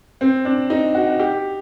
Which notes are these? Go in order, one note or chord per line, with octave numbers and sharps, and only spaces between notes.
C4
D4
D#4
F#4
F#4
G4